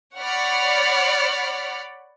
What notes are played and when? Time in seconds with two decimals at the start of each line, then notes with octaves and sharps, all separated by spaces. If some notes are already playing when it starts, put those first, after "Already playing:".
0.19 C#5 D5 F#5 B5 F6